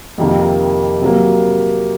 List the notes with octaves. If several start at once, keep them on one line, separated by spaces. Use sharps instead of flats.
F2 C3 D#3 A#3
C3 F#3 A#3